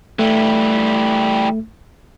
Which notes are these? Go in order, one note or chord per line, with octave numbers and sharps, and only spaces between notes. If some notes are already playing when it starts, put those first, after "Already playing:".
E3 G3 A3